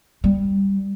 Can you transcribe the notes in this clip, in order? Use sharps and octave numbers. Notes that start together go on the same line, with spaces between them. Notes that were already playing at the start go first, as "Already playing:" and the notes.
G3